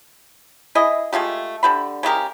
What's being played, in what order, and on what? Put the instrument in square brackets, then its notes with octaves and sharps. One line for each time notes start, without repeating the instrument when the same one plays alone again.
[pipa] E4 G#4 D#5
G#3 A3 F4 G4
D3 G3 B5
C#3 G#3 G4 A#4